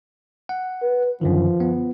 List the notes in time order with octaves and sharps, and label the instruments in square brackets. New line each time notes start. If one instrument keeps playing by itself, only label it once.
[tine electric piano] F#5
[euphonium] B4
[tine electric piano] F#2 D3 D#3 [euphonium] F3
[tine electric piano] B3